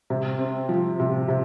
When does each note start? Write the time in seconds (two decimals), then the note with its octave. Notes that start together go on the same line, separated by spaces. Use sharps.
0.10 C3
0.39 C4
0.69 F3
1.00 C3
1.28 C3